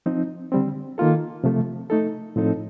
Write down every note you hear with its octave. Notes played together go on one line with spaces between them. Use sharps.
F3 C4 D#4
D3 G3 C4
D#3 A#3 F4 A4
C3 F3 A3
A3 D#4 A4
A2 F3 C4 D#4 A4